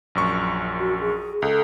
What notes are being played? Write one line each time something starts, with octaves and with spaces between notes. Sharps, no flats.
A#1 F#2 C#6
F#4
G#4
C#2 A4